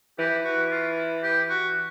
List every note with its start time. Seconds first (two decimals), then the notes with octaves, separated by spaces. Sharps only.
0.19 E3 G4
0.45 F#4
0.71 F4
1.23 G4
1.50 F#4